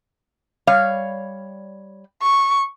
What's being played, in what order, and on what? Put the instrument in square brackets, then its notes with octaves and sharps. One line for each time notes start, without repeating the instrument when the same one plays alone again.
[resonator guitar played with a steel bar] G3 C#5 F5
[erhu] C#6